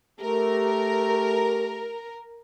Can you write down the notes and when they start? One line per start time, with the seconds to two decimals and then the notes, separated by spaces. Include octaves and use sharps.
0.20 A3 G4 A#4